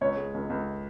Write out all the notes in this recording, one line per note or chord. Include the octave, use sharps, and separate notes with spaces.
C#2 C#5
G#3
C#2
C#2